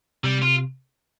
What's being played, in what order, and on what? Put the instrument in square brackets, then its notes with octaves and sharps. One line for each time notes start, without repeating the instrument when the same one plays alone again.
[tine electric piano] C3 [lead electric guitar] G3
[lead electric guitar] F4